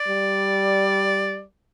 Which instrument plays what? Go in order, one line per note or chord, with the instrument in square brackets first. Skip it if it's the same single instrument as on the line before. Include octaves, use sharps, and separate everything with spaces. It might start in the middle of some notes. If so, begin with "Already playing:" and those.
Already playing: [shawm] D5
[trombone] G3